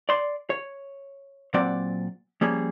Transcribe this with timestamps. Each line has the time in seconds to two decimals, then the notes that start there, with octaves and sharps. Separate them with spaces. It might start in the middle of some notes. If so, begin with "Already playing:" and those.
0.09 D5 C6
0.50 C#5
1.54 A#2 F#3 C4 D5 F#5
2.41 F3 G3 A#3 C#4 G#4